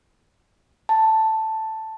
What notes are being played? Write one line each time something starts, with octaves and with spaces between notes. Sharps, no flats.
A5